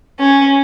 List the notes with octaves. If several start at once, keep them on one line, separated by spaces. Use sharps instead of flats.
C#4